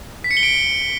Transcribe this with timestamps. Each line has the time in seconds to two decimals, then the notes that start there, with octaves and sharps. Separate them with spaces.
0.24 B6
0.31 C#7
0.37 G7
0.43 D7